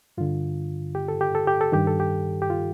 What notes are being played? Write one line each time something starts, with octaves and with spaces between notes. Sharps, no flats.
G2 D3 F4
G4
A4
G4
A4
G4
A4
G2 D#3 G4
A4
G4
G4
F4